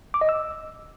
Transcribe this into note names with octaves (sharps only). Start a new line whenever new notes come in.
D6
D#5
E6